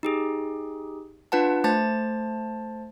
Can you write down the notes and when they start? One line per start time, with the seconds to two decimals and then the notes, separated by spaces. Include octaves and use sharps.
0.03 D#4 G4 G#4
1.32 D4 F4 B4 F#5 A5
1.64 A3 C5 A5 A6